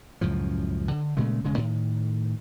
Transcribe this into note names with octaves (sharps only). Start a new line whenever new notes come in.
C#2 F#2 A2 F3
D3
A#2 C#3 G#3 A3
E1 C#3 G#3
A2 D#3